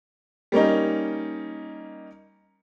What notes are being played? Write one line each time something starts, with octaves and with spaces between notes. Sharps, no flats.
G3 A#3 C#4 D#4